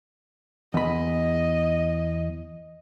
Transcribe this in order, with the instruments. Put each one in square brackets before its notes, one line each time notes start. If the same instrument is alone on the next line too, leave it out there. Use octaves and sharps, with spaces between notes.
[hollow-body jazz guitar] E2 B5 [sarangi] D#5